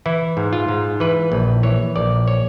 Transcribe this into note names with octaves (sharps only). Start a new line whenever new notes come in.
E3 E4
G#2
F4
G#2
E3 B4
A#1
E3 C#5
A#1 D5
C#5